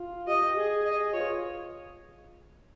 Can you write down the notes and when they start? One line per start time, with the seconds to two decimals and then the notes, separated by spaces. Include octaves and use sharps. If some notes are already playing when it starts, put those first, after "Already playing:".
Already playing: F4
0.27 G4 D#5
0.56 G#4
0.84 D#5
1.13 F4 C#5